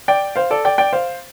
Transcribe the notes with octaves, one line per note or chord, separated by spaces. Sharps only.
D5 G5
C5 F5
A4 D5
D5 G5
D5 G5
C5 F5